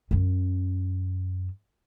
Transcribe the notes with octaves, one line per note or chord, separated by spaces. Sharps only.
F#2 C#4